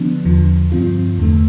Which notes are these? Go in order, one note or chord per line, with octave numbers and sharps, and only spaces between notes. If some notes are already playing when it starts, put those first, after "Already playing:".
Already playing: D3 F3 B3 D4
E2 D3 F3
G2 F3 C4 F4
E2 D3 A3